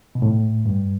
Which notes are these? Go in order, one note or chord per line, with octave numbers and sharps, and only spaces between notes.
B2
A2
G2